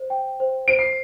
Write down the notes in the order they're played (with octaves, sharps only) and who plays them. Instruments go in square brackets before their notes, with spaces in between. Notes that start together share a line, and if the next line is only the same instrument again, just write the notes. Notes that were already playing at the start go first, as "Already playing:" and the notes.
Already playing: [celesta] C5
G5
C5
[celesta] C5 [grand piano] D7
[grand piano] C7